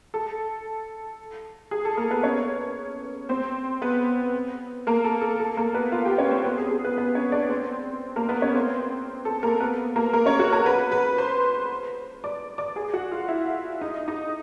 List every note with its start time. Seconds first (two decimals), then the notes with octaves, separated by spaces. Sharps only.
0.14 A4
1.71 G#4
1.85 A4
1.97 A#3 A#4
2.11 B3 B4
2.24 C#4 C#5
3.29 C4 C5
3.82 B3 B4
4.87 A#3 A#4
5.04 A4
5.22 A4
5.40 A4
5.57 A#3 A#4
5.74 B3 B4
5.92 F4 F5
6.05 G4 G5
6.18 C#4 C#5
6.31 C4 C5
6.45 B3 B4
6.58 G#4
6.71 G#4
6.84 B3 B4
6.98 B3 B4
7.15 C#4 C#5
7.32 D4 D5
7.50 C4 C5
8.16 A#3 A#4
8.29 B3 B4
8.42 C#4 C#5
8.55 C4 C5
9.25 A4
9.43 A#3 A#4
9.60 B3 B4
9.96 A#3 A#4
10.13 A#3 A#4
10.26 C#4 C#5
10.39 F#4 F#5
10.52 A#4 A#5
10.66 B4 B5
10.91 B4 B5
11.18 C5 C6
12.24 D5 D6
12.58 D5 D6
12.76 G#4 G#5
12.94 F#4 F#5
13.12 F4 F5
13.28 E4 E5
13.81 D#4 D#5
14.08 D#4 D#5